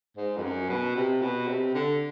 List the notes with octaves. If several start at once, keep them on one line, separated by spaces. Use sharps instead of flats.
G#2
F2
F#2
B2
C3
B2
C3
D3